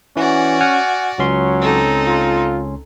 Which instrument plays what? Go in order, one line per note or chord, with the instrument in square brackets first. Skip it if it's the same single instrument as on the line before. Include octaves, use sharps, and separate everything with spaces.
[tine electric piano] E3 [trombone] C#4 [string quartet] F#4 D5
[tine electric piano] F#5 G#5 F6
[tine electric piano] C#2 C#4 C6 [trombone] F#3
[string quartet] C4 D#4 A4
[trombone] F4